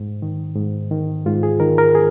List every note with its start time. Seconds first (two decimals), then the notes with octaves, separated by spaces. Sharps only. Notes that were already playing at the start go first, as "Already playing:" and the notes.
Already playing: G#2
0.22 D#3
0.56 G#2
0.91 D#3
1.25 G#2 F4
1.43 G#4
1.60 D#3 A#4
1.78 A#4
1.95 G#4